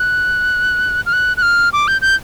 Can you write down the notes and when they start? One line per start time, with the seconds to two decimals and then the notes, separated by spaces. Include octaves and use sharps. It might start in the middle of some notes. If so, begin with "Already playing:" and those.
Already playing: F#6
1.06 F6
1.13 F#6
1.37 F#6
1.42 F6
1.73 D6
1.88 G6
2.02 G6